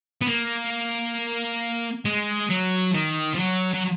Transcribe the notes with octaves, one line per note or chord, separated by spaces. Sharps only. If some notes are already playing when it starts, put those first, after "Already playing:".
B3
A#3
G#3
F#3
D#3
F3
F#3
F#3